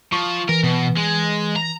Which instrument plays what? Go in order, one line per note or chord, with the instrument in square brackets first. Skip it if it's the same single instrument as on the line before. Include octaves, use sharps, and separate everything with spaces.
[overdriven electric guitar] F3 [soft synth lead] C#6
[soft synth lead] E3 [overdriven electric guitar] A#4
[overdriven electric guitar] B2
G#3
A#5